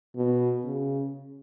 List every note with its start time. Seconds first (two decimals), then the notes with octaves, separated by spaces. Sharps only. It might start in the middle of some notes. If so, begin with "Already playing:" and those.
0.17 B2
0.65 C#3